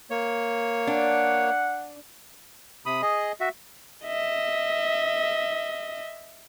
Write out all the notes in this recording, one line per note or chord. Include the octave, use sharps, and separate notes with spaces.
A#3 C#5
D4 F#5
C3 B5 D#6
G#4 D#5
F#4 E5
D#5 E5